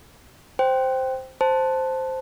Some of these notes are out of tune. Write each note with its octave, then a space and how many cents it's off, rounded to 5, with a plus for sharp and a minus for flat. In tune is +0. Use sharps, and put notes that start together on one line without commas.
C5 +0 G5 -5
C5 +0 A5 +0